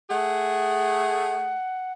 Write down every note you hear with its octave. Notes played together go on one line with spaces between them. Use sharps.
A3 G#4 F#5